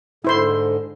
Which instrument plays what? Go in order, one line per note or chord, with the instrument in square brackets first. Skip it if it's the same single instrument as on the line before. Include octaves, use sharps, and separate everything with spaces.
[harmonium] G#2 D3 [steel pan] E4 C5 C6